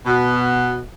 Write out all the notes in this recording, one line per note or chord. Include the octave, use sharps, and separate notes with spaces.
B2